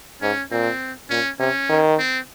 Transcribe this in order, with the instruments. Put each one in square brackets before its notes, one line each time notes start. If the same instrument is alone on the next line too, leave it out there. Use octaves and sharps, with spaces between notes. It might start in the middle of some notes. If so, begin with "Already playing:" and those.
[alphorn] G#2 [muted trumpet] C#4
[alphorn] A#2 [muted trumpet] C4
[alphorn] A#2 [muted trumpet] C#4
[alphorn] C3 [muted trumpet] C#4
[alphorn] D#3
[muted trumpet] C4